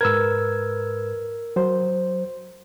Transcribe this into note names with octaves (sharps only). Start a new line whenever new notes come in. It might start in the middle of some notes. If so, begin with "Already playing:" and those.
G#2 A#4 B4 E6 G#6
F#3 C5